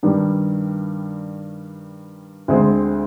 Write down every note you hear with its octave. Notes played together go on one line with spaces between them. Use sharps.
G2 D#3 G3
D2 D3 G#3 C4